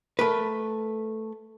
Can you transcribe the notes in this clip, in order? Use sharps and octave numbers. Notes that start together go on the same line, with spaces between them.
A3 A#4 B4